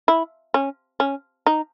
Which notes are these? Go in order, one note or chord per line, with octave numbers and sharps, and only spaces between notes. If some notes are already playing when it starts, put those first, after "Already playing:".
E4
C#4
C#4
D#4